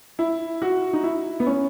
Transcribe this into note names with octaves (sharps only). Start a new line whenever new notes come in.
E4
F#4
D#4
E4
B3
C#4